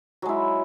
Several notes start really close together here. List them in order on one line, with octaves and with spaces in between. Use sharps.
F#3 G#3 E4